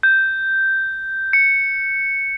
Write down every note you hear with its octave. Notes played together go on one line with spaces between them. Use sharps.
G6
C#7